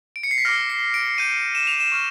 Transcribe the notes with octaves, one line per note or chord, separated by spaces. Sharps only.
D7
C#7
C7
B6
D6 F6 A#6
C7
D7
D6 G6 D#7
E7
F7
E7
C#6 F6